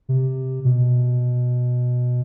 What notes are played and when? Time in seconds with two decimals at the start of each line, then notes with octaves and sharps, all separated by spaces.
0.09 C3
0.65 B2